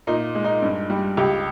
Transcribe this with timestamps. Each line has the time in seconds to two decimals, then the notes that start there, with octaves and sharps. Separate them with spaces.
0.07 A#2 D#4
0.35 G#3
0.44 D#4
0.62 G2
0.90 G3
1.17 C#2 G4